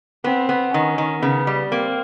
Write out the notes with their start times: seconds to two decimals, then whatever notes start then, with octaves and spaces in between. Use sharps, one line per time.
0.24 B3 C4
0.49 B3
0.73 D#3 C#4
0.98 D#3
1.22 C#3 B3
1.47 G3
1.71 A#3 C4